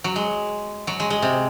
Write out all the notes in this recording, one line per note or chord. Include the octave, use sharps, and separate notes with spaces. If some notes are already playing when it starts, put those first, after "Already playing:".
F#3
G#3
F#3
G#3
G#3
C3